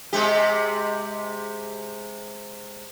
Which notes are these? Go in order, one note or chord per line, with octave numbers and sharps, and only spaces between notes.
C3 G#3 G4